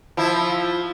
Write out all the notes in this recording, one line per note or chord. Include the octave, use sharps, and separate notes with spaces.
F3 E4